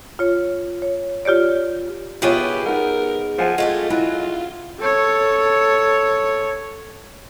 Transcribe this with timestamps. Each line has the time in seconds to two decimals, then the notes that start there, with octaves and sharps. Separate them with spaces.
0.19 F4 C#5
0.82 C#5
1.25 F4 G4 C#5 D5
2.22 B3 F4 G4 G#4 B4 C#5 E5
2.66 D#4 A#4 F#5
3.38 F3 F#5 G#5
3.58 G#3 A3 F4 G4
3.90 F#3 E4 F#4 G#5
4.80 A4 C#5